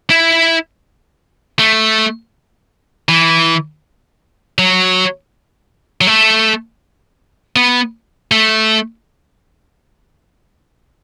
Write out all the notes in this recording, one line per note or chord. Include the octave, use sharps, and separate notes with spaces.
E4
A3
E3
F#3
F#3
A3
B3
A3